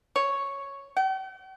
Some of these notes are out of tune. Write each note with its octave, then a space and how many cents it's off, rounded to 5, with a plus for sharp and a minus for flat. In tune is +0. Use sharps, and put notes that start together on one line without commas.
C#5 +0
G5 -45